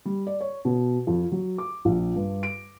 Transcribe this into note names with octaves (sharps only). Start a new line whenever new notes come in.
G3
D5
C#5
B2
F2
F#3
D6
A#1
G2
D7